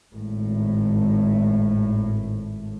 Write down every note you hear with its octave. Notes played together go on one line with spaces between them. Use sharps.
G#1 A2